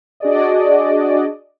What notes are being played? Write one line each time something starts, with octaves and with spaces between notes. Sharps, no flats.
D4 F#4 G#4 D5 D#5